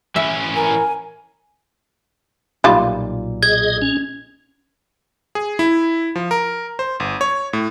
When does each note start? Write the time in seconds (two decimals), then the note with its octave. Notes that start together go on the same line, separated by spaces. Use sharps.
0.16 E3 C#4 E5
0.56 A#4 G#5
2.64 B1 A#2 G3 D#4 F4
3.43 G#4 D#5 G#6
3.82 C#4
5.35 G#4
5.59 E4
6.15 F3
6.31 A#4
6.79 C5
7.00 G1
7.21 C#5
7.53 A2